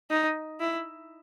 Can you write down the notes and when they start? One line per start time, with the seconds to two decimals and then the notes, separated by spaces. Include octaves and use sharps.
0.10 D#4
0.60 E4